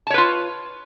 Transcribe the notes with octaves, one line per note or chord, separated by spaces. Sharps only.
F4 B4 C#5 A5